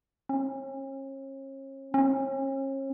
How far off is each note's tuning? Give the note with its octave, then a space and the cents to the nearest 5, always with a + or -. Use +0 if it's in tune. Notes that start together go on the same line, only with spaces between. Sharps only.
C#4 -40
C#4 -40